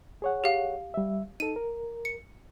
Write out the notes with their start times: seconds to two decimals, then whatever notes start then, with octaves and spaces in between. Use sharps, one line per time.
0.22 G#4 C#5 F#5
0.44 G4 F5
0.94 G3 E5
1.40 D#4 A4 D#7
1.56 A#4
2.05 C#7